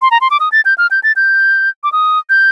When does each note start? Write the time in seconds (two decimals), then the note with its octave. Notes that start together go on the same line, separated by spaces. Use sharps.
0.02 C6
0.11 A#5
0.21 C6
0.31 D6
0.40 D#6
0.52 A6
0.65 G6
0.78 F6
0.91 G6
1.03 A6
1.16 G6
1.84 D6
1.92 D#6
2.30 G6